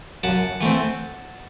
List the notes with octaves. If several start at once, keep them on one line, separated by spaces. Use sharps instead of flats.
F#2 F#5 A5
E3 A3 C4